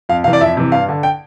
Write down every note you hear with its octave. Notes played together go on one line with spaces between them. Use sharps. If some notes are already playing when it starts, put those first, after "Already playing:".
F2 F5
C3 E3 F5
D5
F2 E5
C3 E3
G2 F5
D3
G5